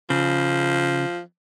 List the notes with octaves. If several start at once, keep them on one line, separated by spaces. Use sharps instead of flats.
C#3 F3